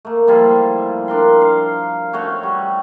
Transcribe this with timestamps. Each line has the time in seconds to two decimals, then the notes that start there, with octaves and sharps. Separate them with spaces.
0.05 A3 A#3
0.27 F3 G3 E4 F4
1.08 D4 A#4 C6
1.41 F5
2.13 A3 C#4 F#4 C#5
2.43 G3